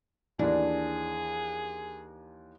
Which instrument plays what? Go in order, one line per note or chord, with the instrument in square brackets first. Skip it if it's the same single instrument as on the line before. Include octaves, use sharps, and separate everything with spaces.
[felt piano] D#2 E3 [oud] D4 [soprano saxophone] G#4